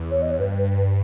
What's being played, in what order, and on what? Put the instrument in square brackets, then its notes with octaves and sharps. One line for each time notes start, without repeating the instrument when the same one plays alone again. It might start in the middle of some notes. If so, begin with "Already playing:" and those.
Already playing: [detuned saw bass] E2
[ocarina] C#5
D#5
C#5
[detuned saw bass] G2 [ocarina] B4
[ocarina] B4
B4